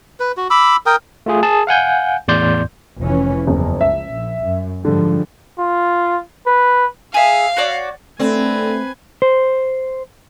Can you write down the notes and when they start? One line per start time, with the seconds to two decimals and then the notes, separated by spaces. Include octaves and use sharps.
0.20 B4
0.37 F#4
0.50 B5 D6 E6
0.86 A#4 G5 D#6
1.26 A3 F4 G#4
1.43 G#4 A5
1.67 F5 F#5 G#5 G6
2.28 E2 A2 D5 C6 G6
3.01 F1 E3 C#4
3.47 F#1 E2
3.81 C#2 E5
4.10 A#1
4.42 F#2
4.85 G#2 D3 F3 G3
5.59 F4
6.47 B4
7.14 G#4 E5 F5
7.57 F#4 C#5 D5
8.19 D3 A3 C4 B4 G#5
9.22 C5